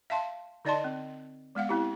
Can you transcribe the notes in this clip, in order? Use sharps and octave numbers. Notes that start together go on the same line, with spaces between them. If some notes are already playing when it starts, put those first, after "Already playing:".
E5 F5 A5 C6
D3 D#4 D5 D#5 A5 C6
C4
G#3 B3 F5 F#5
C4 E4 G4